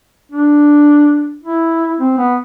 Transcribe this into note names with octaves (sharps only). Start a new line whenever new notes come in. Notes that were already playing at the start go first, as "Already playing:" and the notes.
D4
E4
C4
B3